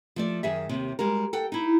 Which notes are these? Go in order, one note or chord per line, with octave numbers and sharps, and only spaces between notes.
F3 A3 D5
F#2 D#3 G#4 E5
D#2 C3
G3 G#3 F#4 A#4
A4 F#5 G5
D#4 E4